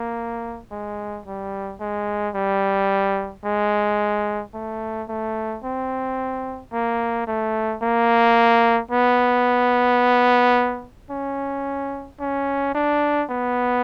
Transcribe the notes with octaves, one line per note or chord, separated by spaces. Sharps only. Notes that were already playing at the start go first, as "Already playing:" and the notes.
Already playing: A#3
G#3
G3
G#3
G3
G#3
A3
A3
C4
A#3
A3
A#3
B3
C#4
C#4
D4
B3